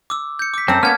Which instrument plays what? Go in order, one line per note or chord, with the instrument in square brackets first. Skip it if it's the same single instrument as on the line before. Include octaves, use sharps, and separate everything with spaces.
[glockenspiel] D6 E6
G6 C#7
D6 B6
[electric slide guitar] F#2 C4 [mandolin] A4 A#5
[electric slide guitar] A#3 B3 C#4 [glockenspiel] F6 G#6